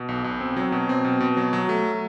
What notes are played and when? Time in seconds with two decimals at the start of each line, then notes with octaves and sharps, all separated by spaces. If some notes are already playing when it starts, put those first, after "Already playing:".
Already playing: B2
0.09 B1
0.24 B1
0.41 C4
0.57 F#3
0.72 B2
0.89 C4
1.05 B2
1.20 B2
1.37 F#3
1.53 F#3
1.69 A3